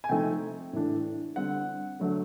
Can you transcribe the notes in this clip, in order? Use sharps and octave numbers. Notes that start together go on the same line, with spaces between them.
G#5
C3 F3 A3 C4 D#4 G5
A2 E3 A3 D4
D3 G3 C4 F#5
D3 F#3 A3 D4